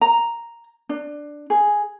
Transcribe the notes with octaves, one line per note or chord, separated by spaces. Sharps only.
A#5
D4
G#4